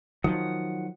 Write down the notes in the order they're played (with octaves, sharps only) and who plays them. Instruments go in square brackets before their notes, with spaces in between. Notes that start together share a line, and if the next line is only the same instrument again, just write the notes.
[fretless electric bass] D#3 F3 F#3 [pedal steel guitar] F#5 D#6